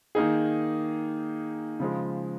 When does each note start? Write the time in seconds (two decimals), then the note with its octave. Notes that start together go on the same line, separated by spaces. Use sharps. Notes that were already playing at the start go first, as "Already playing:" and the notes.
0.15 D#3 A#3 D#4 G#4
1.80 C#3 F3 G#3